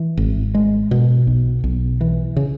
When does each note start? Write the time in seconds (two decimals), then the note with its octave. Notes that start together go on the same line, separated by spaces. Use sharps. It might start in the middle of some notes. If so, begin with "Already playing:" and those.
Already playing: E3
0.17 G#1
0.55 G#3
0.91 B2
1.27 B1
1.64 B1
2.01 E3
2.37 C#3